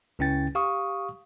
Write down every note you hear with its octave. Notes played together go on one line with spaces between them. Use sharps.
C#2 C#3 C#4 E4 G5 A6
G4 F5 C#6 D#6